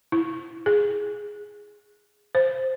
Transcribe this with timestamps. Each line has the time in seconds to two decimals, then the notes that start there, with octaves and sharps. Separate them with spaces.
0.12 E4
0.66 G#4
2.35 C5